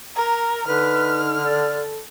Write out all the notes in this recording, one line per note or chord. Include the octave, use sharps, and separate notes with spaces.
A#4 A#5
D3 D#4 B4 F6
A4 D5